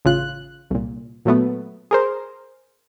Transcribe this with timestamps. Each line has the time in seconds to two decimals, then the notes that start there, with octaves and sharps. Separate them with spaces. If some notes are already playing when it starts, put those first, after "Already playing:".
0.05 A1 C#3 F4 F#6
0.70 C2 A#2
1.25 A#2 F#3 A3 B3
1.91 G#4 A#4 C5